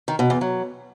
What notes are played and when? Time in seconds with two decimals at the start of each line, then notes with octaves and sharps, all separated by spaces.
0.08 D#3
0.19 B2
0.30 E2
0.41 F#3